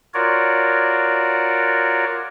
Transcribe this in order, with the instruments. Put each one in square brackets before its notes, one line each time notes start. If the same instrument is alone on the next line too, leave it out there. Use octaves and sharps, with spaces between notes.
[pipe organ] F4 F#4 A#4 C#5 D5